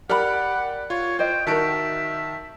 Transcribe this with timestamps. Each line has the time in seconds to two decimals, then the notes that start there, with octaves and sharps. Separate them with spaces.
0.09 G4 A#4 D5 F#5 B5
0.90 F4 C#5
1.19 C5 D#5 G5
1.47 D#3 F#4 A#4 E5 A5 D7